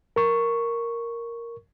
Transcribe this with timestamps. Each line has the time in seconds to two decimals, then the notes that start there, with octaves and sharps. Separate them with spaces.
0.16 A#4 C#6